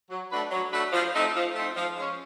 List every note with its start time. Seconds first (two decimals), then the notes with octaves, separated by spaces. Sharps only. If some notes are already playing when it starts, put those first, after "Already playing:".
0.10 F#3
0.31 A3 D4 F#4 B4
0.51 F#3
0.72 A3 D4 F#4 B4
0.92 F3
1.14 A3 C4 D#4
1.35 F3
1.55 A3 C4 D#4
1.76 F3
1.97 G#3 C#4